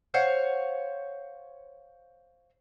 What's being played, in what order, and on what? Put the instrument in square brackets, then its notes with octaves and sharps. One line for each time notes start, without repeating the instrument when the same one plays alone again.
[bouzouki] C5 C#5 F5 F#5